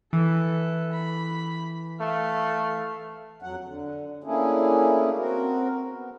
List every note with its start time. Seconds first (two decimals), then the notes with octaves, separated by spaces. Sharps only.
0.13 E3 A4 B4
0.93 B5
2.01 A3 F5
3.42 F2 F#3 F#5
3.64 D3
4.24 A3 A#3 C#4 D4 E4 G#4
5.17 C4 F#4 A#4
5.91 B3